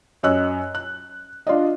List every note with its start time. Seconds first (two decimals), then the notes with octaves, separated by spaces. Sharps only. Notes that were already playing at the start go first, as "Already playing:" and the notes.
0.23 F#2 C#5 D#5 E6 F#6
0.75 F#6
1.47 D4 F4 D5 D#5